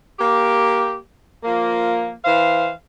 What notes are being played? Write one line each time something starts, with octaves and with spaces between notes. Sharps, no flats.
A#3 G4
F3 A#3
E3 C5 F5